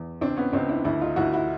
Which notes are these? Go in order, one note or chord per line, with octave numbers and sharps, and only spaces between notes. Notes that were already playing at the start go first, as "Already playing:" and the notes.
Already playing: E2
C#2 C4 D4
B3 C#4
C#2 C4 D4
D4 E4
D2 D4 E4
D#4 F4
D2 E4 F#4
E4 F#4